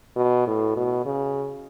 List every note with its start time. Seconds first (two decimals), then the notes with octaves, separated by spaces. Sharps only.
0.16 B2
0.47 A2
0.77 B2
1.06 C#3